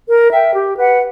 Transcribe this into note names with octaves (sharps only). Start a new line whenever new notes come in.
A#4
E5 G5
G4
B4 F#5